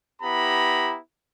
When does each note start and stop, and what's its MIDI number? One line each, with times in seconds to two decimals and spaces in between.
0.22 0.97 59
0.22 0.97 64
0.22 0.97 67
0.22 0.97 82
0.22 0.97 83